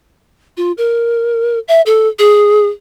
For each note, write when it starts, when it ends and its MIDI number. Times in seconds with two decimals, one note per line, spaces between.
0.57 0.72 65
0.78 1.59 70
1.68 1.81 76
1.86 2.08 69
2.19 2.66 68